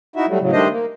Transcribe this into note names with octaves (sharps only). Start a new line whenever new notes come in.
D#4 E4 F#4 E5
F#3 G3 A3
A2 C#3 F#3
D#3 G3 A3 D4 C5 D#5
A#3